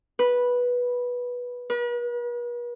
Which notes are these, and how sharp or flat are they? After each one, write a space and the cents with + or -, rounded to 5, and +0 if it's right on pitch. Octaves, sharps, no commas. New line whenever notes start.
B4 -10
B4 -45